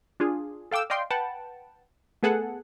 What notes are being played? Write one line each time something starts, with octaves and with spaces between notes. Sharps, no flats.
D4 F4 G#4
A4 F5 G5 D6 E6
D5 D#5 F5 G5 C6
B4 F#5 G5 A5
A3 B3 G#4 A4 F#5